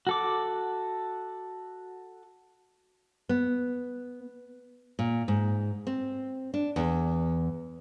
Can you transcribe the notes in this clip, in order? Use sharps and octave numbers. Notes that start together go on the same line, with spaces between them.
F#4 A4 D6
B3
A#2
G#2
C4
D4
E2